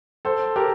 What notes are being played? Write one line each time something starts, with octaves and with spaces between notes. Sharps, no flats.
A4 C5
G4 A#4